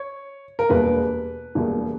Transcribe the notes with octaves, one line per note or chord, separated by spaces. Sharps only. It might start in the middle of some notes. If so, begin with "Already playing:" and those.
Already playing: C#5
A#4
E1 E2 B2 G3 A#3 B4
E1 E2 B2 G3 A#3